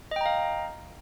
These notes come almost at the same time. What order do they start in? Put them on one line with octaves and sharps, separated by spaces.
D#5 G5 A#5 F5